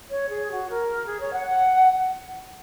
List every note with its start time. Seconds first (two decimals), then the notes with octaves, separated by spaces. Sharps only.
0.10 C#5
0.29 G#4
0.50 F#4
0.68 A#4
1.08 G#4
1.21 C#5
1.34 F#5
1.46 F#5